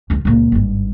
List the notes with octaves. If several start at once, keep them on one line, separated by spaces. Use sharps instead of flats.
C#2 F4
C#2 A#2
G#1 G2